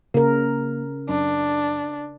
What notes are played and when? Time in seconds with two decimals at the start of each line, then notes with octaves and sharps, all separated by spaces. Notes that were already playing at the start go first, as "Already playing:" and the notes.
0.14 C#3 A#3 A#4
1.09 F#2 D4